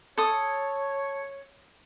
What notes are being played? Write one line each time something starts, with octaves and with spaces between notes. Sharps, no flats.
A4 C#5 D#6